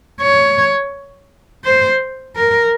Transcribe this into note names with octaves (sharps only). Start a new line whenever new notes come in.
C#5
C5
A#4